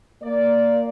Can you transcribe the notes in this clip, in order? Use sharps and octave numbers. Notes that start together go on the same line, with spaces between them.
A#3 D5